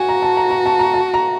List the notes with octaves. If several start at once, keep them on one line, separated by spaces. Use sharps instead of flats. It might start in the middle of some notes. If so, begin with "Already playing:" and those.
Already playing: F#4 G#5
A#5
A5
A#5
A#5
A5
A#5
A5
A#5